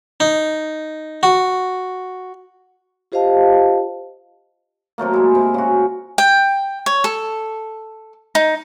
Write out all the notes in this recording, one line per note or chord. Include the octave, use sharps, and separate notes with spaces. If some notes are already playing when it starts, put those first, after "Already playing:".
D#4
F#4
F4 G4 C5 D#5 F5 A5
C3 F#3 A3 A#3
G#3 E4
C3
C#3 F#4
G5
C#5
A4
D#4